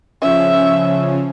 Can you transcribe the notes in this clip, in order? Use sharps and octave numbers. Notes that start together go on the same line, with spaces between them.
C#3 F3 C#4 E5